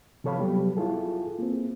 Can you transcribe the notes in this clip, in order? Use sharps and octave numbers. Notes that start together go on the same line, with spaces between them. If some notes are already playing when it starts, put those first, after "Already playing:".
C3 F3 A4 C#5 F5 B5
F#3 G3 B3 G4
E4 F4 G#4 A4
A#3 C4